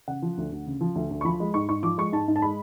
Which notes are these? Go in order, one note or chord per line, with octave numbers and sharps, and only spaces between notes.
C#3 F#5
F3
D2
D2
C#3
F3
D2
D2
C#6
F3 B5
G#3
G#2 C#6
G#2 C#6
F3 D6
G#3 C#6
G#2 A5
G#2
A5
G#3 B5